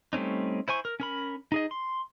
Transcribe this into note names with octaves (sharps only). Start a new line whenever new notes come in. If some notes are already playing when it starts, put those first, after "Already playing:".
G3 A3 C4 C#4 D#4
E4 C5 G#5 C#6
A#4
C#4 A#4 B5
D#4 G#4 D#5
C6